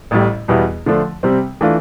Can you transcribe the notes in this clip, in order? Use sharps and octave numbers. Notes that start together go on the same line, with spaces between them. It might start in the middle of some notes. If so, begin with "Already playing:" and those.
A1 A2 G3
E2 B2 G3 B3 E4
D3 F3 A3 D4
C3 G3 C4
E3 A3 D4 F4